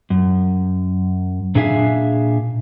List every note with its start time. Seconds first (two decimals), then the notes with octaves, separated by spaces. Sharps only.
0.10 F#2
1.55 A#2 D4 G#4 E5 F5 G#5